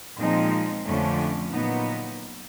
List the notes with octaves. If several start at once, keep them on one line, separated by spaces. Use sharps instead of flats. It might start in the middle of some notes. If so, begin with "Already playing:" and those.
A#2 F3 G#3 C4 D#4
F2 D3 F3 A3 C#4
A#2 F#3 B3 D#4